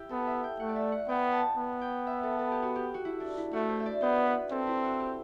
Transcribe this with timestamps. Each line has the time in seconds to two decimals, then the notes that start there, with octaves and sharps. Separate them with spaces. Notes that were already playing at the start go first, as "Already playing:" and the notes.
Already playing: E4 G4
0.10 B3 A4
0.27 E5
0.44 G5
0.60 A3 F#5
0.69 D5
0.76 E5
0.92 F#5
1.08 B3 G5
1.33 A5
1.57 B3
1.81 G5
2.07 E5
2.23 A4
2.39 A4
2.51 G4
2.62 F#4
2.76 G4
2.94 F#4
3.05 E4
3.20 D4
3.37 E4
3.53 A3 F#4
3.69 C5
3.80 E5
3.86 D5
4.02 B3 C5
4.26 B4
4.51 C4 A4
4.67 E4
4.84 F#4
5.00 G4